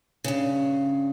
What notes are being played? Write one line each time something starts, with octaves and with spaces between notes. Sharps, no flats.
G2 C#3